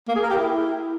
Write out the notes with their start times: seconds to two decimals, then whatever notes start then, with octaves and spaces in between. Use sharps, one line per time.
0.08 A#3
0.15 G#4
0.23 A#4
0.30 G4
0.38 E4